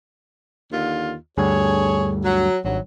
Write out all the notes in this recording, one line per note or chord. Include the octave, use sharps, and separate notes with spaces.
D#2 D3 F4
D2 G2 D3 G#4 C#5
F#3
G#1 G2 F#3